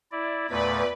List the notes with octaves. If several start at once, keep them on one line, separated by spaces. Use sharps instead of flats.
E4 D5
E2 A#2 A3 B4 D5 B5